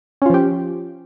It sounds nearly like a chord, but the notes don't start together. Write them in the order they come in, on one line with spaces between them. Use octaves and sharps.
C#4 F4 F3 G4